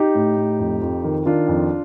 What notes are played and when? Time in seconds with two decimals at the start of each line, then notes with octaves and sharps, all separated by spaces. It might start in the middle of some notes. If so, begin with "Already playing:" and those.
Already playing: D#4 G4
0.15 A2
0.37 A2
0.59 F2
0.82 F2
1.04 D#3
1.26 D#3 D4 F4
1.48 F2